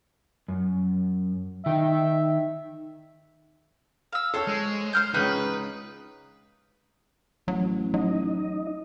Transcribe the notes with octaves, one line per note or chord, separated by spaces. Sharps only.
F#2
D#3 E5 G5
F5 E6
A4 C5 C#5 E6
G#3
C5 F6 G6
C#2 C#3 D#4 B4 F#6
A1 F#3
F#3 D#4 D#5